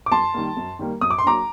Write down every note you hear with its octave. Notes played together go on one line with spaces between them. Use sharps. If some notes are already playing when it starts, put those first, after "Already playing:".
D6
F#2 A5 C6
D#3 G3 A#3
F#2
D#3 G3 A#3
F#2 D#6
D6
C6
F#3 A#3 D4 A#5 D6